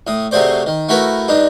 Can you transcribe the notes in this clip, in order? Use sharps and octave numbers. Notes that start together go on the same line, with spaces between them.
A2 D#6
C3 F#3 A3 G#4 C5 D5
D#3
A3 E4 F#4 A#4 B4
G2 D4 D#4